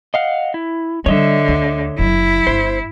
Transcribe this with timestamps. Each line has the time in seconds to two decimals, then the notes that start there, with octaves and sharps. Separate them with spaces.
0.14 D#5 F5 F#5
0.54 E4
1.06 D3 G3 C#5 D#5 E5
1.48 D2
1.99 F#1 F#3 E4
2.47 G1 C5